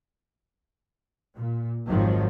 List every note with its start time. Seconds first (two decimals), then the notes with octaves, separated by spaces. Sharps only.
1.35 A#2
1.87 G#1 F2 G#2 D#3 F3 F#3